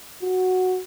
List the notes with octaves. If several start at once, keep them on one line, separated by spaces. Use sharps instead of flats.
F#4